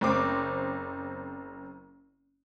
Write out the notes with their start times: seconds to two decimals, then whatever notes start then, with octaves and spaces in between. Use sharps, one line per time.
0.01 F#1 C4 D6